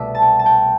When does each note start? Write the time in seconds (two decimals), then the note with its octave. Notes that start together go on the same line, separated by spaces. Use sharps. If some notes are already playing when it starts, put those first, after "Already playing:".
Already playing: C2 B2 A3 D5 E5
0.15 A5
0.22 G5
0.39 A5
0.46 G5